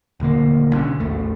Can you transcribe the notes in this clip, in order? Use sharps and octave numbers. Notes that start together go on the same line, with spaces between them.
D#1 D2 D3 A#3
B1 D3 C#4
A1 D#2 A3